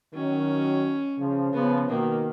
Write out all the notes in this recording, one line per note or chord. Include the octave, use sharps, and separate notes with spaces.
D#3 F#3 C#4
C#3 F3
C#3 F3 B3
B2 D#3 A#3